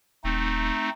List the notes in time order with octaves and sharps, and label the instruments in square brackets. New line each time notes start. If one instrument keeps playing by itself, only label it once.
[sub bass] D#1 [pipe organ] A3 C4 D#4